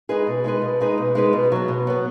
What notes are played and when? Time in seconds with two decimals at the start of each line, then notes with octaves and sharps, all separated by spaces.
0.09 G#3 D#4 G#4 B4
0.27 B2
0.44 G#3 D#4 G#4 B4
0.62 B2
0.81 G#3 D#4 G#4 B4
0.98 B2
1.15 G#3 D#4 G#4 B4
1.33 B2
1.52 F#3 B3
1.68 B2
1.87 F#3 B3